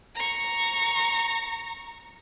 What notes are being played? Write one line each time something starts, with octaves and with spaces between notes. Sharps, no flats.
A#5 C#6